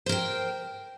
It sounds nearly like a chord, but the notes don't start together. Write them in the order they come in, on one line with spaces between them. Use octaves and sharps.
C5 A#4 G5